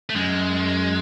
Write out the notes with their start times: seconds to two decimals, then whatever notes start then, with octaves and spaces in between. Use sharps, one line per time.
0.10 A3
0.15 F#2 G#3